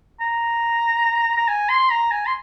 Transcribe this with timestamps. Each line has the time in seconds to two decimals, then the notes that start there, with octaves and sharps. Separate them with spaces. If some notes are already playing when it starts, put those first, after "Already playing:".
0.21 A#5
1.37 A#5
1.48 G#5
1.69 C6
1.90 A#5
2.11 G#5
2.26 C6